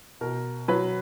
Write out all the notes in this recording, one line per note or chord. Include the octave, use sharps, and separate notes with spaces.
B2 A#4
F#3 B4